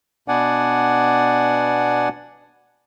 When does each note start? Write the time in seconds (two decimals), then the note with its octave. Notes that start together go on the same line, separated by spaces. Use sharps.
0.28 B2 B3 D4 D5 F#5 G#5